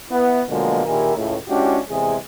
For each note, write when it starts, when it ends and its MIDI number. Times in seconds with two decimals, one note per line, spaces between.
0.10 0.40 59
0.10 0.40 64
0.48 0.82 47
0.48 0.82 50
0.48 0.82 53
0.48 0.82 54
0.48 0.82 56
0.48 0.82 58
0.86 1.13 46
0.86 1.13 51
0.86 1.13 64
0.86 1.13 67
0.86 1.13 68
0.86 1.13 70
1.16 1.36 37
1.16 1.36 45
1.48 1.77 56
1.48 1.77 61
1.48 1.77 62
1.48 1.77 64
1.48 1.77 66
1.48 1.77 67
1.89 2.16 40
1.89 2.16 48
1.89 2.16 56
1.89 2.16 68